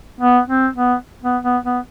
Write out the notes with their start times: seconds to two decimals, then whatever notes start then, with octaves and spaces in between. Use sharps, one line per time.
0.20 B3
0.48 C4
0.75 B3
1.23 B3
1.43 B3
1.64 B3